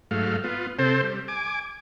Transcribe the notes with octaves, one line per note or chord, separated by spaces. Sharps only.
G#2 F#3 A3 F5
B3 F4
C3 C4 A4 C5
G3
G#5 D6